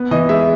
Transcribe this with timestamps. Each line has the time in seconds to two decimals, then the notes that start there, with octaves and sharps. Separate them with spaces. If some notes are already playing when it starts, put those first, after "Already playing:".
Already playing: B3
0.11 E3 D#5
0.29 G#3 E5